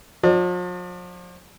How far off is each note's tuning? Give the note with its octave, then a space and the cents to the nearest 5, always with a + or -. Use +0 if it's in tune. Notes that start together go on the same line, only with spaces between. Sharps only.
F3 +45 D5 +40